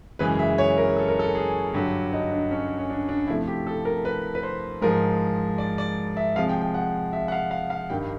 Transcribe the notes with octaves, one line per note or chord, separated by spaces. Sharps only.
F#2 C#3 E3 G#3 B4
E5
C#5
A#4
A4
A#4
A4
G#4
G2 D3 F#3 G4
D#4
D4
C#4
C#4
D4
D4
C3 F3 A3 E4
G4
A4
A#4
B4
B4
C5
G#2 F3 G#3 A#4
D5
D5
E5
C3 F3 G#3 F5
G5
G5
F#5
E5
F#5
F5
F5
F5
G2 D#3 G3 G5